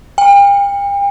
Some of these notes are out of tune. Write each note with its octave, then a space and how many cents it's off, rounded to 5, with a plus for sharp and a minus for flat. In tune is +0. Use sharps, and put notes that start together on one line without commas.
G5 +40